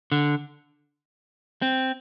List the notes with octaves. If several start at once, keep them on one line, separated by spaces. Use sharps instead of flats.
D3
C4